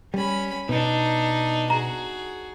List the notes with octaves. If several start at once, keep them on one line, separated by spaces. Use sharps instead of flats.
G3 C#4 B5
B2 D4 D#4
F#4 G#4 A#5